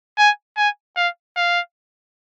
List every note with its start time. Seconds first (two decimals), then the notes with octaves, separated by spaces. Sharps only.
0.18 G#5
0.57 G#5
0.96 F5
1.36 F5